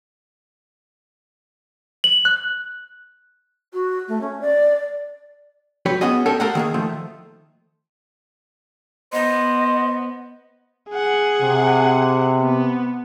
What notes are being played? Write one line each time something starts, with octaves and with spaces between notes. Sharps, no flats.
F#7
F#6
F#4
A3
C#4
D5
F#3 G4 B4 C#5
B3 C#4 F#4 G#4 D#5
C#4 G4 A4 A#4 C#5
G4 A4 A#4 F5 F#5
D#3 A#3 G#4
D#3 F3 A3
B3 C5 D#5
G#4 F#5
C3
B3